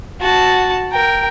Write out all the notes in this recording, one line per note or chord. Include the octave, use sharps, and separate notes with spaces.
F#4 A5
A#4 G5